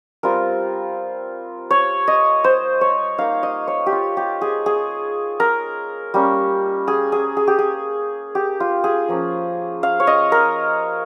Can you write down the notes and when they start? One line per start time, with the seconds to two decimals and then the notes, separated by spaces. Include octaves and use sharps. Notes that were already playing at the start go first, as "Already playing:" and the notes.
0.23 G3 C4 F4 A#4
1.70 C#5
2.08 D#5
2.44 C5
2.81 C#5
3.18 A#3 D#4 F5
3.43 D#5
3.67 C#5
3.86 G4
3.92 F4
4.17 G4
4.41 G#4
4.66 G#4
5.40 A#4
6.14 G3 A#3 C#4
6.88 G#4
7.12 G#4
7.37 G#4
7.47 G4
7.58 G#4
8.35 G4
8.60 F4
8.84 G#4
9.09 F3 A#3 C#4
9.83 F5
10.00 C#5
10.07 D#5
10.32 A#4